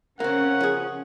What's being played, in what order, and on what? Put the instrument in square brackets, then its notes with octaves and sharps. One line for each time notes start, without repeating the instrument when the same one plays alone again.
[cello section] C#3 C#4 [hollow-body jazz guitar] A#3 C4 [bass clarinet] A#4 [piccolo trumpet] F#5
[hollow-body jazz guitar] F3 G#4